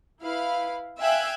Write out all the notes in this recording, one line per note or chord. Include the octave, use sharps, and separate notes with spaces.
E4 B4 F5 B5
E5 F5 G5 G#5 F#6 G#6